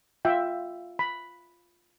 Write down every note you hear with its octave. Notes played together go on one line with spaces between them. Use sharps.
F4 E5 G5
B5